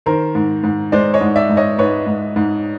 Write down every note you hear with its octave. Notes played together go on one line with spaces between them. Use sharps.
D#3 A#4 C5
G#2
G#2
G#3 C5 D5
C#5 D#5
G#2
D5 E5
G#2
C#5 D#5
G#2 B4 C#5
G#2
G#2